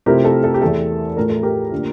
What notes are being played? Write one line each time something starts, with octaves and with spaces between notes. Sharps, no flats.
C3 F3 A3 C4 E4 G4 A#4
A4
A4
G4
E2 E3 A3 A4
A2 F3 A3 A#4
A4
G4 A#4
D3 F3 A#3 D4